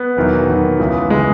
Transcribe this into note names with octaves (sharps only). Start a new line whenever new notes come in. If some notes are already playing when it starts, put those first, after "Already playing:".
Already playing: B3
E1 E2 D#3 F#3
E1 E2 D#3 F#3
C#2 C#3 E3
C#3 E3 G#3